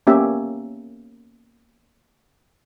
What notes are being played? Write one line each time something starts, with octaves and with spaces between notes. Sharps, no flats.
A#3 B3 C#4 G4 E5